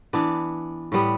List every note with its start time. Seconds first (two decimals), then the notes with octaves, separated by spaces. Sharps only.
0.13 E3 B3 D4
0.92 A2 G3 B3